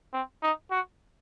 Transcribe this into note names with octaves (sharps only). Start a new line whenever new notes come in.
C4
D#4
F#4